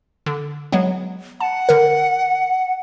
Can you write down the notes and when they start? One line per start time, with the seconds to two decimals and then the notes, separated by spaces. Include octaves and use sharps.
0.26 D3
0.72 F#3 G#3 B3
1.40 F#5 A5
1.69 D3 A#4